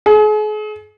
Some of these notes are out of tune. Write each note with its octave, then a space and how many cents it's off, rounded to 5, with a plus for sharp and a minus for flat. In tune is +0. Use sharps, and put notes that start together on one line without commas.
G#4 +40